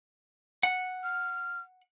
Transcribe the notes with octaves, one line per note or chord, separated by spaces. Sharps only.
F#5
F6